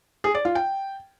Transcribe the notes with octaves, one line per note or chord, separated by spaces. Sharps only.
G#4
D5
F4
G5